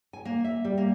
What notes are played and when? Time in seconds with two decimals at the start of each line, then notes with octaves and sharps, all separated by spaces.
0.13 G#5
0.25 A#3
0.44 E5
0.65 G3
0.78 A#3